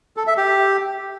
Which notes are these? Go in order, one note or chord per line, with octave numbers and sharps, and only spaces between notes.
A4
E5
G4